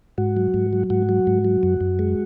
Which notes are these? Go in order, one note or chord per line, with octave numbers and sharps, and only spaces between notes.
G#2 F#4
F#3
G#2
F#3
G#2 F#4
F#3
G#2
F#3
F#2
F#2
G#3